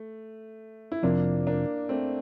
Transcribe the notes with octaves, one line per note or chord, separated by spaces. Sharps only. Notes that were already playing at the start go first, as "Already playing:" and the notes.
Already playing: A3
E4
F2 C3 F3 A#3 C4 D4
A#3 D4
A3 C4